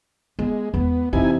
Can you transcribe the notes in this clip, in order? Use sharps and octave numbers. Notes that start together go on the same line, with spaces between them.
G#3 B3
E2 G#3 B3
F2 C3 E3 D#4 E4 G#5